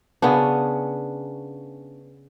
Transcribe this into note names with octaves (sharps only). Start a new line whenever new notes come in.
C#3 B3 C#4 D4